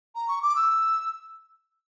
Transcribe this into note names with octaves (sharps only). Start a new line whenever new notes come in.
A#5
C#6
D6
E6